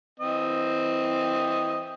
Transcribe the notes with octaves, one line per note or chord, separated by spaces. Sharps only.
E3 C4 D#5